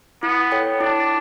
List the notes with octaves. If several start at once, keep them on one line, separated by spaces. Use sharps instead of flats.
B3 E4
A4 C#5 G5
D4 E4